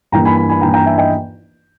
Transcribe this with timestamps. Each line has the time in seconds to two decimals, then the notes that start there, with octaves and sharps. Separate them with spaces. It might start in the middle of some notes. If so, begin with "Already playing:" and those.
0.12 G2 E3 A#3 G5 A#5
0.25 G#5 B5
0.37 G#5 B5
0.49 G#5 B5
0.61 G2 E3 A#3 G5 A#5
0.73 G5 A#5
0.86 E5 G#5
0.98 D#5 G5